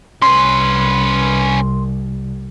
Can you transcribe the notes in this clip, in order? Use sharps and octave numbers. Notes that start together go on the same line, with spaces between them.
C2 C#4 B4 C6